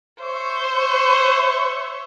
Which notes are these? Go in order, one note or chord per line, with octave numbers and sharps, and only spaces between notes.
C5 C#5 E5 C#6